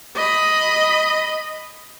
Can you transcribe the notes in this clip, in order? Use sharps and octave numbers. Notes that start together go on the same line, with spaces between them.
D#5 B5